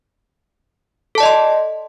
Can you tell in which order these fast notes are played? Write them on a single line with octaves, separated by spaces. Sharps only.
A4 A5 D5 D#5 C6